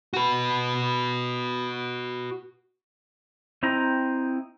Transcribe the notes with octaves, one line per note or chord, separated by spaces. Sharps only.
F#4 B4
C4 E4 D#5 G5 A#5